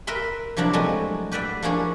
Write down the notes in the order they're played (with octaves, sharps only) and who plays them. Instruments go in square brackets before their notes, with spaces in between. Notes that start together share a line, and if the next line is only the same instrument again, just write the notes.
[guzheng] A#4 B4 E5 B5 C6
C3 F3 F#3 D4 E4
F#3 G#3 A3 B3 C4
G4 B4 D5 E5 F#5
F3 A#3 D4 E4 G#4 C#5